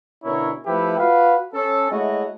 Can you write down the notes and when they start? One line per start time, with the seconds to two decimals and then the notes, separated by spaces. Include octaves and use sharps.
0.24 B2 D3 C#4 E4 A#4 C#5
0.66 F3 A3 E4 G4 A4 B4
0.98 F4 F#4 B4 F5
1.53 C#4 A4
1.91 G#3 A3 E4 F#4 C#5 D#5